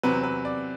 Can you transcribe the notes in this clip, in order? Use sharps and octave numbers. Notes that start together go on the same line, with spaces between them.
E2 C3 F#3 C4 B4
B4
D5